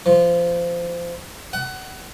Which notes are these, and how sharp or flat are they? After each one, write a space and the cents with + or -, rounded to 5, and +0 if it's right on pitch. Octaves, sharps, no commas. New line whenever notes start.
F3 -20
F#5 +25